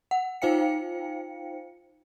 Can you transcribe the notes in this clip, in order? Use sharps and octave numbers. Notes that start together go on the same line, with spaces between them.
F#5
D#4 F4 C5 F5 G5 C#7